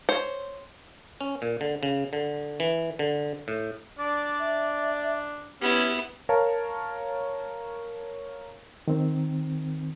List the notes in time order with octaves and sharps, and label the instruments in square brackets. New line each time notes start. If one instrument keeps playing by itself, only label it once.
[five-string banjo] C5 C#5
[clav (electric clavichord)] C#4
A#2
D3
C#3
D3
E3
D3
A2
[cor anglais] D4 [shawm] D5
[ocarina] E5
[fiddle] B3 E4 [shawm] C#4 [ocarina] G4
[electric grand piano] A#4 C#5 F5 A5
[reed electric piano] D#3 C4